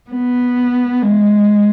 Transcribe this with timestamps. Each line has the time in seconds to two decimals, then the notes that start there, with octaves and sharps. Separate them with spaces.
0.11 B3
1.02 G#3